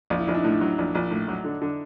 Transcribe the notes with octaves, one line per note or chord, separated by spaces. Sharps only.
A#1 F4
E4
A#1 D#4
D4 E4
A2
F#3
A#1
A#1
A2
F#3
D3
D3